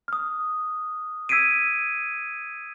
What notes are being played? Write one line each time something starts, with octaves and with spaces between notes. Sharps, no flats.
D#6 F6
E6 G#6 B6 C7 D7 D#7